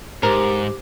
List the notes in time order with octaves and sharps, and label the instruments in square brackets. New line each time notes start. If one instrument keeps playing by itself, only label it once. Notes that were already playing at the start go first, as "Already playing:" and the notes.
[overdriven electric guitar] G#2 [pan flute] G4 [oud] A#4 [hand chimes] C5